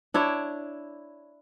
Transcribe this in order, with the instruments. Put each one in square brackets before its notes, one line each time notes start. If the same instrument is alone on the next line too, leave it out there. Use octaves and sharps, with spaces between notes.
[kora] D4 E4 C#5